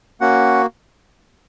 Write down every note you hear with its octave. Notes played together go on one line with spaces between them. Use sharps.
A#3 C#4 F#4 F#5